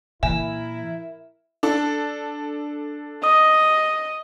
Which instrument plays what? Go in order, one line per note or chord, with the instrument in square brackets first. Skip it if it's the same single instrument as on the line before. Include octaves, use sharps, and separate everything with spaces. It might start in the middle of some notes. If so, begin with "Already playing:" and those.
[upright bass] A#2 E3 [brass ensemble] E4 A#4 [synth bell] E5 [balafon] G#5
[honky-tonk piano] D4 A4
[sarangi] D#5 [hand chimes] D#6